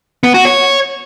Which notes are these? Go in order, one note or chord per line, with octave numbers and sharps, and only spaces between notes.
B3
F#4
C#5